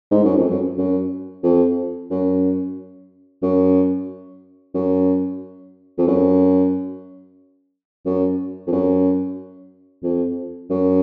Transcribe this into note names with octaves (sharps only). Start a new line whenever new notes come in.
G#2
F#2
F2
F#2
F#2
F2
F#2
F#2
F#2
F2
F#2
F#2
F2
F#2
F2
F#2